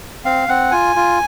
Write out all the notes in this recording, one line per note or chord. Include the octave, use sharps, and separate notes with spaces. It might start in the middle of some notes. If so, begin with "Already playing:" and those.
C4 F5
C4 F#5
F4 G#5
F4